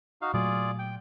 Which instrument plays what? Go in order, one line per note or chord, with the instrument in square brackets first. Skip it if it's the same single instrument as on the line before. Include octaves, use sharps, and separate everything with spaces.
[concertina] D#4 F#4 F5
[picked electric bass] A#2 F#3 A3 [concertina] F4 G#4 D5
[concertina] G5